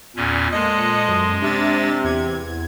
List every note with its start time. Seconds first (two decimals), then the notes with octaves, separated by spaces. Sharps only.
0.16 E2 A#2 C#4
0.52 A#2 G#3 A4 C5 D#5 F#6 C#7
1.08 F#2
1.42 C3 D4 E5 A6
2.04 E2 G#6